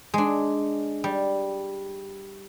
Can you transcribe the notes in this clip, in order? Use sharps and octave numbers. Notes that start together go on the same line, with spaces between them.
G#3 D4
G3